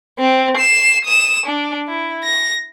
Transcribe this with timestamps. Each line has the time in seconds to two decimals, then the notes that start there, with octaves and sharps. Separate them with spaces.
0.19 C4
0.57 C7 E7
1.05 D#6 E7
1.46 D4
1.88 E4
2.24 A#6